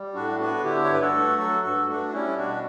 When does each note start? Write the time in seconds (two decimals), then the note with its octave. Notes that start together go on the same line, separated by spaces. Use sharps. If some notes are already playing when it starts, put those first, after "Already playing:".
Already playing: G3
0.14 A2 D4 F#4
0.39 B3 D4 F#4
0.63 D3 E4 G4
0.84 C#5
0.89 G2 B4
1.01 F#4 A4
1.14 A3
1.38 F#3 F#4 A4
1.63 G2 F#4 A4
1.87 A3 D4 F#4
2.08 F#4
2.12 G3 C#4 E4
2.36 B2 D4 F#4